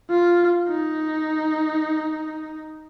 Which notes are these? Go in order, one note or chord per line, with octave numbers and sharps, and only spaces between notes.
F4
D#4